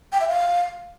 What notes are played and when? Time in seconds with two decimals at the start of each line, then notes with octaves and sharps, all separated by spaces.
0.12 G5
0.21 E5
0.29 F5